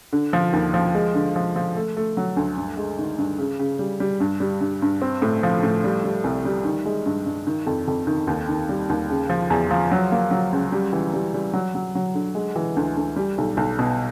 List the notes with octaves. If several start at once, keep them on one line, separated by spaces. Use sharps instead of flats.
D3
F3
D#2
F3
G#3
D3
F3
F3
A3
A3
F#3
D2
G2
G#3
D#3
G2
C#3
C#3
G3
G3
G2
G3
G2
G2
C4
A2
F3
A2
G3
G3
C2
G3
D#3
G#3
G2
G2
D#3
F2
F2
D#3
D#2
D#3
G3
D#2
C#3
F3
E2
F3
F#3
A#3
F#3
C#2
G3
E3
G3
G3
F#3
F#3
F#3
D3
G#3
E3
D2
D2
G3
B1
B1
B2